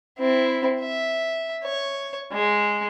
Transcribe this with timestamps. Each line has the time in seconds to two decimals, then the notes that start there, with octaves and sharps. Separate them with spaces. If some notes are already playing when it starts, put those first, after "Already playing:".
0.18 C4 E4
0.81 E5
1.65 C#5
2.32 G#3